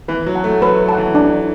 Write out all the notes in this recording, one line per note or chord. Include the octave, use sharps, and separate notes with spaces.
E3 B4
F#3
F#5 A5
A3
F#3 B4
F#5 A5
E3
D4